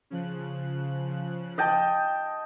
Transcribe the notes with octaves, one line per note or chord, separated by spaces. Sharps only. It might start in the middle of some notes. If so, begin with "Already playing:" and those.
C#3 F3 F#6
D#5 G5 A5